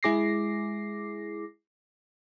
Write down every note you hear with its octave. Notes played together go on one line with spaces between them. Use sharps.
G#3 E4 G#4 D6 A#6 C7